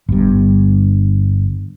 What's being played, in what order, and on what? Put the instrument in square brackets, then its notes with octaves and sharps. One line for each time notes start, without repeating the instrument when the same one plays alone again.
[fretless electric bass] G1 G2